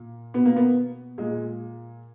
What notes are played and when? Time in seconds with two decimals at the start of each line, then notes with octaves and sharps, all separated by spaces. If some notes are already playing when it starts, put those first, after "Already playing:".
Already playing: A#2
0.34 B2 B3
0.45 A#3
0.56 B3
1.18 A#2 G#3